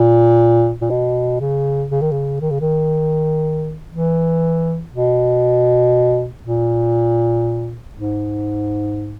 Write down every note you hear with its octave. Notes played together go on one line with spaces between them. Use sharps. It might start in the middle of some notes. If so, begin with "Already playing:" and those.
Already playing: A#2
A#2
B2
C#3
C#3
D#3
C#3
D#3
C#3
D#3
E3
B2
A#2
G#2